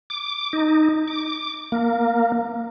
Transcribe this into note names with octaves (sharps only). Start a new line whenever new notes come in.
D6
D#4
D6
A#3